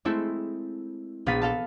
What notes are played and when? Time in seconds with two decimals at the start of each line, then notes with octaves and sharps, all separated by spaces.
0.05 G#3 A3 C4 E4 A4
1.26 A#1 B3 F5 A6 B6 D#7
1.42 A4 F5 A5